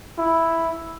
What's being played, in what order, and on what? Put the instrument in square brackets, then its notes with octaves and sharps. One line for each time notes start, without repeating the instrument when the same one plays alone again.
[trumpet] E4